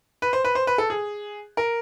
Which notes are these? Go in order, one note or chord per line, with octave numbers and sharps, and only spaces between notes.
B4
C5
B4
C5
B4
A4
G#4
A#4